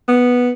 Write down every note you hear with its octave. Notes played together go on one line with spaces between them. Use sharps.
B3